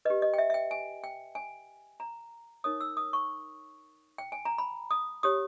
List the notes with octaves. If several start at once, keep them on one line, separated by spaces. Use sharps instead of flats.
G4 B4 D#5
D#5
G5
E5
E5
G5
G#5
G5
G#5
A#5
D#4 A#4 C#5 D#6
E6
D#6
C#6
G5
G#5
A#5
B5
D#6
G4 C#5 D#6